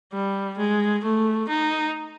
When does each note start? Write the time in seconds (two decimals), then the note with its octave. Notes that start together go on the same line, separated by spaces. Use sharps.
0.13 G3
0.58 G#3
1.04 A3
1.49 D#4